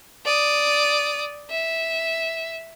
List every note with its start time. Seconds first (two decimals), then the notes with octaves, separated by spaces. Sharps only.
0.25 D5 D#6
1.50 E5